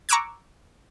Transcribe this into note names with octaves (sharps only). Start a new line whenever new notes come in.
A#5 C#6 D6 E6 F#6 G#6